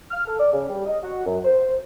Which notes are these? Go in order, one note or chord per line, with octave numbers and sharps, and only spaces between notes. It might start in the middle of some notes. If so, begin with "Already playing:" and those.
F6
A4
D5
C#3
G3
D#5
F#4
F#2
C5